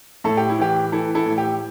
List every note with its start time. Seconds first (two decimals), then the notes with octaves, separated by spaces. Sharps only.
0.24 A2 A4
0.37 G4
0.49 E4
0.59 E3 G4
0.92 E3 E4 A4
1.15 E4 A4
1.26 A2
1.38 G4